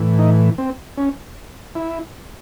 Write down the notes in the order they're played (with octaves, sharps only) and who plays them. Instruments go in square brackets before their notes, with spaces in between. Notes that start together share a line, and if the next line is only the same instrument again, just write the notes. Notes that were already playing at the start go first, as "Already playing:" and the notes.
Already playing: [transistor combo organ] A2 E3
D#4
C4
C#4
E4